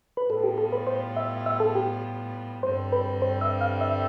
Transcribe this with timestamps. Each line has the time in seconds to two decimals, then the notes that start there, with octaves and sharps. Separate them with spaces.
0.17 B4
0.28 A2 G3 B3 F4 A4
0.43 G4
0.58 A4
0.72 B4
0.87 C5
1.16 E5
1.46 E5
1.60 A4
1.75 G4
2.63 G2 D3 G3 C4 C5
2.92 B4
3.22 C5
3.41 E5
3.61 F5
3.81 E5